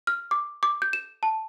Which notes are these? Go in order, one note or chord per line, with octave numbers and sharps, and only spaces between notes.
F6
D6
D6
G6
E7
A5